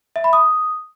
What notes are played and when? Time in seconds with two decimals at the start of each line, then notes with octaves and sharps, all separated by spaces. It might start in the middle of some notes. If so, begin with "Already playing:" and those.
0.16 E5
0.24 B5
0.33 D#6